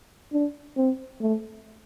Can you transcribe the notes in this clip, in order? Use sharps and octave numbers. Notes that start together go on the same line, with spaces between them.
D4
C4
A3